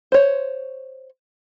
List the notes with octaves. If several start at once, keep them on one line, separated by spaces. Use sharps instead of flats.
C5 C#5